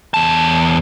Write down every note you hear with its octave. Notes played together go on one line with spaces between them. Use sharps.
E2 A5